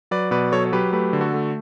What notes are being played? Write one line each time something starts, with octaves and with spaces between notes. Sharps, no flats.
F#3 B4 D5
B2 B4 D5
F#3 A4 C#5
C#5
F#3 G4 B4
A3 G4 B4
D3
F#4 A4
A3